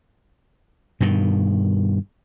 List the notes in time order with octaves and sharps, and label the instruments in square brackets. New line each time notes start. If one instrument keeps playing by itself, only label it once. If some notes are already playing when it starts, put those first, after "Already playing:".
[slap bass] G2 B2 D#3